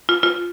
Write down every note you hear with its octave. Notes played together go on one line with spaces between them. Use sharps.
F4
F4